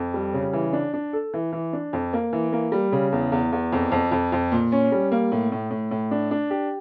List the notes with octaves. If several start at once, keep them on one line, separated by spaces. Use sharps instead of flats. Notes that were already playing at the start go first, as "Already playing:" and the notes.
Already playing: F2
G3
C#3
E3
D4
D4
A4
E3
E3
D4
F2
A#3
E3
A#3
G3
C#3
E2
E2
E2
F2
F2
F2
F2
A#2
C#4
G3
A#3
A2
A2
A2
A2
D4
D4
G4